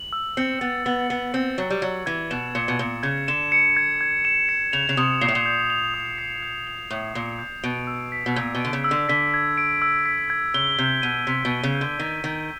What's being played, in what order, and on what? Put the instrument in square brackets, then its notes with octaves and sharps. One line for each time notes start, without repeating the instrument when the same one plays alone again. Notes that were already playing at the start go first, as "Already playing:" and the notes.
Already playing: [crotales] F#7
E6
[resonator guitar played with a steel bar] C4 [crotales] C#7
[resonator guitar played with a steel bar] B3 [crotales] A6
[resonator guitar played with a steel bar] B3 [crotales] F#7
[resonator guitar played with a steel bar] B3 [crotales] E6
[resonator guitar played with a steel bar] C4 [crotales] C#7
[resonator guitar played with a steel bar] F#3 [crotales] A6
[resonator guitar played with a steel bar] G3
[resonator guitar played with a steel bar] F#3 [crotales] G#6
[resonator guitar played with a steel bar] E3 [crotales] G#6
[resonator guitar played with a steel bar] B2 [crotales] E7
[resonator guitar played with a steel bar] A#2 [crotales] C#7
[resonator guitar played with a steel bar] B2
[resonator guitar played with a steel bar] A#2 [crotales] G#6
[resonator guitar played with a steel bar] C#3 [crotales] G#6
[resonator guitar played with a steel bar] D3 [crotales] E7
[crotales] C#7
G#6
G#6
E7
C#7
[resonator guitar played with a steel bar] C#3 [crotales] F7
[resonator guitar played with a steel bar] C#3
[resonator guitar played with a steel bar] C3 [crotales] D#6
[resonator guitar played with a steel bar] A#2 [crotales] C7
[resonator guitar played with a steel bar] A2
A#2
[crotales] G6
F7
D#6
C7
G6
F7
[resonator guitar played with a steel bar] A2 [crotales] D#6
[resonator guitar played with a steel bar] A#2 [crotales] C7
[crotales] G6
[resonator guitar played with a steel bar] B2 [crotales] D7
[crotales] E6
B6
[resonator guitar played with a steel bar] B2
[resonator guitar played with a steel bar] A#2 [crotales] G#6
[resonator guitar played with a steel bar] B2
[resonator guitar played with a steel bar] D3 [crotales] D7
[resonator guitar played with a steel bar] C#3
[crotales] E6
[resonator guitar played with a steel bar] D3
[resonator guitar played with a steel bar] D3 [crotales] B6
[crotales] G#6
D7
E6
B6
G#6
[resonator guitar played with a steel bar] C#3 [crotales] G7
[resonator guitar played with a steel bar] C3 [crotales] G6
[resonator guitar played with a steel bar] B2 [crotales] D#7
[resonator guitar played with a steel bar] C3 [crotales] B6
[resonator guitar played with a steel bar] B2
[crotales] G7
[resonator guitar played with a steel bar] C#3
[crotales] G6
[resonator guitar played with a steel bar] D3
[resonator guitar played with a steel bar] D#3 [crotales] D#7
[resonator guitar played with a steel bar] D#3 [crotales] B6